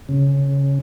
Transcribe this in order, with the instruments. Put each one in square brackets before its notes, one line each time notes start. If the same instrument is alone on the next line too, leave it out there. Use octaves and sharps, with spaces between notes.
[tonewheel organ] C#3